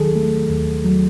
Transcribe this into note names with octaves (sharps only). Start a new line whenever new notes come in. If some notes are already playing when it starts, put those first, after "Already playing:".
Already playing: D#2 D#3 F#3 G#4 A4
A3
D#2
F#3